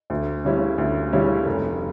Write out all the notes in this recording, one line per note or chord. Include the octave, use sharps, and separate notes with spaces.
D2
C#3 G3 C#4 E4
D2
C#3 G3 C#4 E4
F1